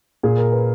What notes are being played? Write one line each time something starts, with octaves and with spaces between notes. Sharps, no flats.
A#2 G#4
A#4
B4